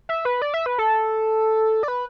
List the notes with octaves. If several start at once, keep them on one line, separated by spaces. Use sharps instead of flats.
E5
B4
D5
E5
B4
A4
D5
B4